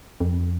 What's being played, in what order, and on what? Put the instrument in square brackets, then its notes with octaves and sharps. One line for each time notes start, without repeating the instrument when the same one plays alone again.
[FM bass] F2